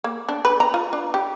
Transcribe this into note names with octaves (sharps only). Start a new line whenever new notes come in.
A#3
D4
B4
A#5
F4
D4
G4